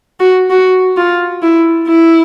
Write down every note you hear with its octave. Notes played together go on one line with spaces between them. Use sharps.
F#4
F#4
F4
E4
E4